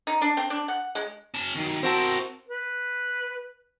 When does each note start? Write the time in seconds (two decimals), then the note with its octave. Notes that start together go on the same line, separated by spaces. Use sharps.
0.07 D#4
0.21 D4
0.37 C4
0.50 D4
0.68 F#5
0.95 G#3
1.34 C#4 A5
1.55 D#3 F#3
1.83 C4 E4 F#4 A#4 A5
2.49 B4